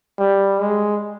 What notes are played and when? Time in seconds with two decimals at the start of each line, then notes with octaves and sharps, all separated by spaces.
0.19 G3
0.59 G#3